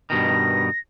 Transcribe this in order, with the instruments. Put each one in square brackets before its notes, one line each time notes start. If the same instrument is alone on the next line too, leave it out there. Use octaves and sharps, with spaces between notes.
[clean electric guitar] G2 B2 D#3 [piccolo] A#6